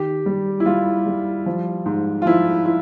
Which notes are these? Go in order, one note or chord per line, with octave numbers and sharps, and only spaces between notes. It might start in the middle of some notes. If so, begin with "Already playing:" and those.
Already playing: D#3 G4
G3
E4
G3 F4
G3
F3
G#2
F4
F3 E4
E4